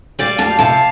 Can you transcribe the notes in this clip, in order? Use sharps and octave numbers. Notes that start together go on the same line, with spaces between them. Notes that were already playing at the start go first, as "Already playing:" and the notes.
G3 D5 F5
F2 F5 A5
C3 F5 A5